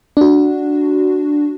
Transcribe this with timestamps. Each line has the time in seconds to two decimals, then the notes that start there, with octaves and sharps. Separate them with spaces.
0.17 D4 F#4